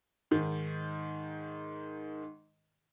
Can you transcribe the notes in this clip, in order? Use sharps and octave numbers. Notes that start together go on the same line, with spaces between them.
G#2 D#3